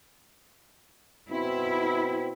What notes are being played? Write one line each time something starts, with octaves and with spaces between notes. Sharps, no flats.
B2 C4 E4